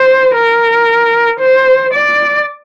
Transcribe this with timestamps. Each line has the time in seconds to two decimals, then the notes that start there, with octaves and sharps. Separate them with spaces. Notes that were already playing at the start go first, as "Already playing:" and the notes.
Already playing: C5
0.36 A#4
1.40 C5
1.93 D5